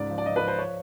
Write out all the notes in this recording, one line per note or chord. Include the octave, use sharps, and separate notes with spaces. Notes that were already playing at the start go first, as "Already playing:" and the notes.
Already playing: C#2 G#2 D5
F3
D5
F3 D#5
B4
F3
C5
C#5